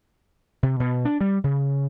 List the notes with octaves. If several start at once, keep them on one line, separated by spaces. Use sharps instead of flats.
C3
B2
D4
G3
C#3